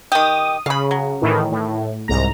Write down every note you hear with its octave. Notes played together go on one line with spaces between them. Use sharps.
D#3 G4 D#6
C#3 F5 B5
F#3
A2 D#3 E3
A2
C2 G#2 A#5